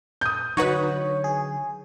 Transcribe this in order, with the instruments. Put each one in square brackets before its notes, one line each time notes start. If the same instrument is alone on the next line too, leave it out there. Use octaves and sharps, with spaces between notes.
[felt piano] D#6 G6
[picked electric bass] D3 F#3 [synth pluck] D#4 F#4 B4 [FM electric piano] C#5
[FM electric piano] G#4